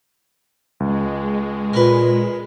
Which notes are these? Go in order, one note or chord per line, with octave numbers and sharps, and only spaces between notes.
C#2 G#3
A#2 A#4 B4